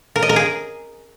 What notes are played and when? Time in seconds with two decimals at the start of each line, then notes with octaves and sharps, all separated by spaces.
0.16 A#4
0.22 D#5
0.29 A#4
0.36 G#4